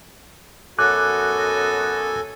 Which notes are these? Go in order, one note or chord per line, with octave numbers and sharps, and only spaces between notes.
F#2 B3 F#4 A4 G#5 D6 F#6